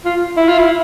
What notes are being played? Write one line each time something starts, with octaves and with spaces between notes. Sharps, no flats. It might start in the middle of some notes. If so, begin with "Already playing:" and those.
F4
E4
F4
E4